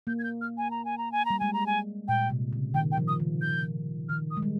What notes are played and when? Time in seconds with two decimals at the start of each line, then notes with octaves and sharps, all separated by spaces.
0.07 A#3 G6
0.19 G#6
0.24 G6
0.41 F6
0.58 G#5
0.71 A#5
0.85 G#5
0.98 A#5
1.12 G#5
1.25 G3 A#5
1.40 G#3 G#5
1.53 A#5
1.67 G#5
2.08 A#2 G5
2.30 C3
2.53 C#3
2.74 D#3 G5
2.92 G5
2.97 F3
3.08 D#6
3.20 D#3
3.41 G6
4.09 D#3 F6
4.31 D#6
4.37 G#3
4.42 G3